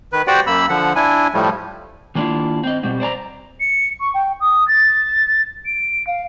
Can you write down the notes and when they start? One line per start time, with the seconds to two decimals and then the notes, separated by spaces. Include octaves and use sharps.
0.13 D#3 B4
0.27 F#4 G4 C5 D5 F#5 G5
0.47 F#2 A#3 B5 E6
0.70 D3 F3 F#5
0.96 D4 E4 G#5
1.34 A2 F3 G3 A3
2.15 D#3 A#3 D4 E4 F4
2.64 C4 D#5
2.83 B2 G3 C4
3.00 C5 D5 A5 A#5
3.61 C#7
4.01 C#6
4.14 G5
4.41 D#6
4.68 A6
5.66 D7
6.07 F5